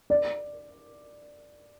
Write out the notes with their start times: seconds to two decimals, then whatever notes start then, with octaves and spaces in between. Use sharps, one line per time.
0.10 D5